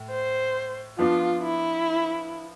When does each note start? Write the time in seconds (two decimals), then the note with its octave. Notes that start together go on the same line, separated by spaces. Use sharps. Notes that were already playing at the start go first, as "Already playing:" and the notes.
Already playing: A2
0.10 C5
0.98 F3 B3 D4 F4
1.43 E4